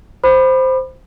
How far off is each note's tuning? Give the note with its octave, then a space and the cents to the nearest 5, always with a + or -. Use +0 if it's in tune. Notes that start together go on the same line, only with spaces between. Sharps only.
C5 -5 B5 +0 D6 +40